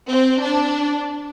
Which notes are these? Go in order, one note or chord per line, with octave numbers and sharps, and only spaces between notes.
C4
D4